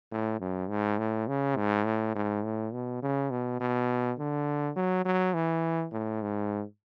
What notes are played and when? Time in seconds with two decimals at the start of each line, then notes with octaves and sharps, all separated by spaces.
0.12 A2
0.40 F#2
0.70 G#2
0.99 A2
1.28 C#3
1.57 G#2
1.86 A2
2.16 G#2
2.45 A2
2.73 B2
3.03 C#3
3.31 B2
3.61 B2
4.19 D3
4.77 F#3
5.05 F#3
5.34 E3
5.93 A2
6.22 G#2